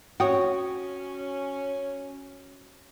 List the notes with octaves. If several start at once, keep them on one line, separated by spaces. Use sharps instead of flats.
C#4 F#4 C#5 F#5 G5 D#6